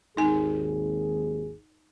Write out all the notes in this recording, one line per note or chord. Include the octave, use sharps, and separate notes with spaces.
G#1 D#2 D#4 G#4 G#5